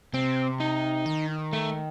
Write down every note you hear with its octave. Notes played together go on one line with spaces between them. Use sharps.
C3 C4
D#4
D#3
A3